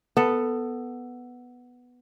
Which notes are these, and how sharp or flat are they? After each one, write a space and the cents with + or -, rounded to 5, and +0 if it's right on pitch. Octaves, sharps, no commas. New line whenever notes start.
B3 +0 A4 +10